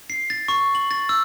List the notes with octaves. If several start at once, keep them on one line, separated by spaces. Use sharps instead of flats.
C7
A6
C#6
F#7
A6
E6